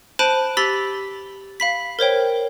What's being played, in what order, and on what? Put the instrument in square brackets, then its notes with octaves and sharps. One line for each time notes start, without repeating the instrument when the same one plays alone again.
[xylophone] C5 A5 B5 F#6 D7 D#7
G4 B5 E6 A6 B6 G7
F5 B5 B6
A#4 C5 C#5 G5